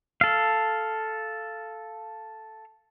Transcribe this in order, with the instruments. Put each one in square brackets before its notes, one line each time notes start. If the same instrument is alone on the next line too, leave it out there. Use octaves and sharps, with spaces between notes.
[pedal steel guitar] A4 F5